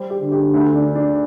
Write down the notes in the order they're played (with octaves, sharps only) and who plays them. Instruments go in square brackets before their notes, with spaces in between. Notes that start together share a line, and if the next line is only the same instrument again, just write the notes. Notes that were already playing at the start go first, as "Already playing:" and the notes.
Already playing: [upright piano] G3 C5
G4
[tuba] D3
[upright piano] G4
D2
D4
D4